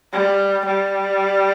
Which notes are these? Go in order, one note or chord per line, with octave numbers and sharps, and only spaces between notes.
G3
G3